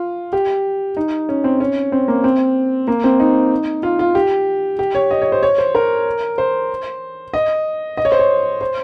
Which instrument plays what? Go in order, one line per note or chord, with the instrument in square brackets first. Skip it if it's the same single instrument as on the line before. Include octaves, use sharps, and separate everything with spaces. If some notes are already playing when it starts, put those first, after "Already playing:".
Already playing: [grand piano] F4
G4
D#4
C#4
C4
C#4
C4
A#3
C4
A#3
C4
D#4
F4
F4
G4
G4
C#5
D#5
C#5
C5
C#5
C5
A#4
C5
D#5
D#5
C#5
C5
C#5
C5